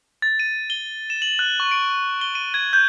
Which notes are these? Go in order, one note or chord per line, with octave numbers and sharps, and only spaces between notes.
A6
D#7
G7
E7
F#7
F#6
C#6
D7
G7
D#7
G#6
G6